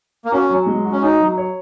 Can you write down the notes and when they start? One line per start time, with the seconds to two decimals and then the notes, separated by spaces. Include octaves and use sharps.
0.25 A#3
0.32 C#4 F#4
0.50 F#3
0.66 G#3
0.85 F#4
0.92 C#4
1.02 D#4 F#4
1.20 F#3
1.38 C#5